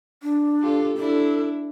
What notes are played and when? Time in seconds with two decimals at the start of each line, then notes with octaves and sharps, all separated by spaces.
0.23 D4
0.62 F4 G4 A4
0.97 D4 E4 A4